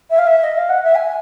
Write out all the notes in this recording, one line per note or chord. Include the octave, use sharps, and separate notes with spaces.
E5
F5
E5
D#5
F5
F#5
E5
G#5